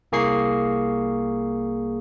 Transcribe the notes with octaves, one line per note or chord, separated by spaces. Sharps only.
C2 A#3 G#4 C#6 C7